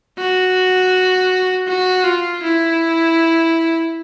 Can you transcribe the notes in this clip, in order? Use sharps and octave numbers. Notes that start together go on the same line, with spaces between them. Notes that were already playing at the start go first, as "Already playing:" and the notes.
F#4
F#4
F4
E4